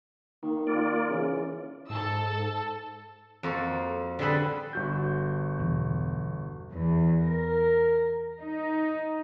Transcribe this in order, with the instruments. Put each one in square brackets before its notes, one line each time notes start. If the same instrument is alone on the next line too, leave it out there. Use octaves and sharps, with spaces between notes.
[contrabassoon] D#3 [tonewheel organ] A#3
[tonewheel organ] A#3 F4 D5
[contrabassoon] C#3 [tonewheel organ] E3
[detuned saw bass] G#2 [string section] A4 A5 E6
[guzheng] F2 A#3 F#4 A4
D3 G3 G#4 A4 B4 B5
[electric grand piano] G1 F#4 G6
[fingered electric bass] E2 B2
[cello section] E2
A#4
D#4